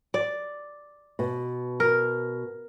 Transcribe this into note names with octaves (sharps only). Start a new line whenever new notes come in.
D5
B2
A#4